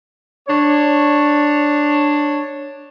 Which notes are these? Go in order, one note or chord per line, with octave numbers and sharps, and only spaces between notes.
D4 C#5